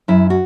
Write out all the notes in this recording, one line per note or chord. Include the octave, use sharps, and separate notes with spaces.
F#2 E4
F#4